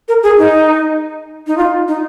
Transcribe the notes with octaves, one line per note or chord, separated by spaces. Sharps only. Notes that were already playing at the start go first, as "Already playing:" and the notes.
A#4
G#4
D#4
D#4
F4
D#4